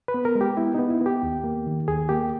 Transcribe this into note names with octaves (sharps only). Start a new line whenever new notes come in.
B4
B3
A#4
G#3
G4
B3 E4
B3 D#4
E4
B3 G4
D#2
A#3
D#3
D#2 G#4
A#3 G4